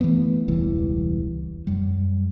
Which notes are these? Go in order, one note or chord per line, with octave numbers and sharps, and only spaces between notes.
E3 F#3 A3 B3
E1 C#2 E3 G3
F#2 G3